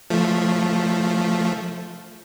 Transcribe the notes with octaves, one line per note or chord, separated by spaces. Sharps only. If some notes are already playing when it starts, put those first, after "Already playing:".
F3 A3